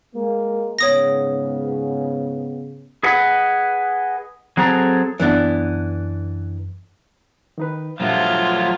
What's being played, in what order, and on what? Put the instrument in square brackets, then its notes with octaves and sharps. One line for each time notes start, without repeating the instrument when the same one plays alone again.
[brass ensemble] G#3 A#3
[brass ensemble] G#2 C#3 B3 [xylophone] C#5 D#6 A#6
[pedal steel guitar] G#4 B4 D#5 F#5
F#3 C4 G#4 A4 A#5
[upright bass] F#2 A#3 [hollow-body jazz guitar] E3 B3 D4
[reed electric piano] D#3 D#4 B4
[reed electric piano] G2 A#2 E5 [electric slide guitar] F3 F#3 A3 [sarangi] F4